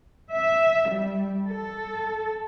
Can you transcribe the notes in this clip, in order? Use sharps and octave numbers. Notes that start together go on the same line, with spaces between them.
E5
G3
A4